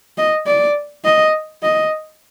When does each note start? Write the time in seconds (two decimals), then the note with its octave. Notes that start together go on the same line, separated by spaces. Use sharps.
0.18 D#5
0.47 D5
1.05 D#5
1.63 D#5